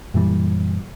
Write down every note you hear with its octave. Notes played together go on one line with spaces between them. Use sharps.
F#2 A#2 E3 G3